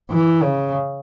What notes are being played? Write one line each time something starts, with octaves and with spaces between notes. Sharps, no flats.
E3
C#3